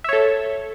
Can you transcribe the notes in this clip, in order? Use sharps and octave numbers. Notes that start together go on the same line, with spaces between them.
A4 C#5 E5